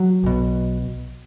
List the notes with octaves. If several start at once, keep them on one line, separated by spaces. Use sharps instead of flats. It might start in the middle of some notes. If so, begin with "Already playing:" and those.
Already playing: F#3
B1 B2